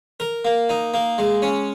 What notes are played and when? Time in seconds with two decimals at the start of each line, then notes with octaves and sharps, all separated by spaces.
0.20 A#4
0.45 A#3
0.69 D#4
0.94 A#3
1.18 G#3
1.42 C#4